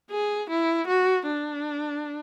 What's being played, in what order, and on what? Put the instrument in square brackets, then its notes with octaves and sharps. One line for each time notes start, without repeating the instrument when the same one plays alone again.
[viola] G#4
E4
F#4
D4